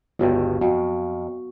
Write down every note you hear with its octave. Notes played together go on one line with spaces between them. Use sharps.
G1 C#2 G2 B3 F#4
F2 F#4